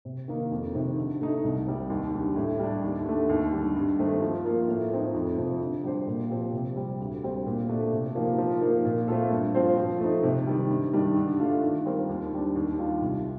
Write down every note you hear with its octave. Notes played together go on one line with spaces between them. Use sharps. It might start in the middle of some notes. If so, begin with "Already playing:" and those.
C3
D#3 A#3 D#4
F2
C3 D#3
D3
A3 D#4
C2
C3 G3
D#2
D3 G3
A2
G3 D4
D#2
D3 A3
D#2
D3 G3
G2
D#3 A3 C4 D#4
F3
A#3 F4 A#4
A2
F3 C4 D#4
F2
C3 F3
D3
G3 D4 G4 C5
A#2
F3 C4 G4
C3
G3 C4
D2
D3 G3 C4
A#2
A3 D4
C3
F3 A#3 D#4 G4
F3
A#3 D#4 A#4
A#2
A3 C4 F4 A4
G2
F3 C4 F4 C5
F3
A3 D#4
C3
D#3 G3
G2
D#3 G3 D4
D3
A3 D4 F4
D#3
G3 C4 F4 A#4
D#2
D3 G3 D4
D#2
D#3 G3 D4 F4
C2